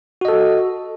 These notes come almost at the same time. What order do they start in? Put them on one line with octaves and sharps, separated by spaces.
F#4 D#5 A4